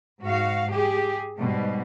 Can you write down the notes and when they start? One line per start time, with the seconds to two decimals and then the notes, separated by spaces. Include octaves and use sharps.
0.23 G#2 F#4 F5
0.72 G4 G#4
1.37 G#2 B2 G3